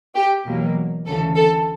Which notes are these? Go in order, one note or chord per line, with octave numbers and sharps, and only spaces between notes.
G4
E2 B2 F#3 A#3
D2 C#3 E3 A4
A4